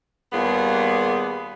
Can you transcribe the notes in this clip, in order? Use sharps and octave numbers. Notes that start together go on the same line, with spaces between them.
D#2 G3 B3 F4 G#4